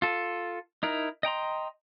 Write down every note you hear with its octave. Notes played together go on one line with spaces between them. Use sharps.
F4 A4
D#4 E4 A#4
D#5 G5 A#5 C6